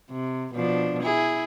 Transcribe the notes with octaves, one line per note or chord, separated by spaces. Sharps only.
C3
B2 F3 D4
E4 G#4